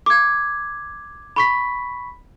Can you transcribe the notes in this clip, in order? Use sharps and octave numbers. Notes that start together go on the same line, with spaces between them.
D6 G#6
B5 C#6 B6